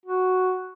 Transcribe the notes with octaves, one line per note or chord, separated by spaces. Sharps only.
F#4